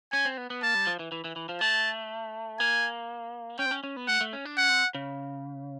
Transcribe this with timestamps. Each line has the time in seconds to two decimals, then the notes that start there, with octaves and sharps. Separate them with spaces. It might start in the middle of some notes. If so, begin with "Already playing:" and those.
0.12 C#4 G#5
0.25 C4
0.37 B3
0.50 B3
0.63 A#3 A5
0.75 G3
0.87 F3
0.99 E3
1.12 E3
1.24 E3
1.36 E3
1.49 F3
1.61 A3 A5
2.59 A#3 G#5
3.59 C#4 G5
3.66 C4
3.71 C#4
3.84 C#4
3.96 B3
4.08 A3 F#5
4.21 A3
4.33 C#4
4.45 D4
4.57 C#4 F#5
4.69 C4
4.95 C#3